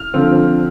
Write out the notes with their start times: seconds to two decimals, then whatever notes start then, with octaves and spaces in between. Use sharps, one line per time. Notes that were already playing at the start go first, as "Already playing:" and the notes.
Already playing: F6
0.14 D3 F3 C4